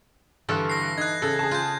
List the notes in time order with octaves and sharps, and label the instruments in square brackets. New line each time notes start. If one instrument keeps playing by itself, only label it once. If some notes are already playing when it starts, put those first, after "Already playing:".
[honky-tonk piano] G2 D3 [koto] E3 A4
[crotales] A#6 C7
[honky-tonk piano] D#4 [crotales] F#6 G#6
[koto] C#3 [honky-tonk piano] A4
[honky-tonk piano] G#4 A5
[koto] F4 [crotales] F#6 G6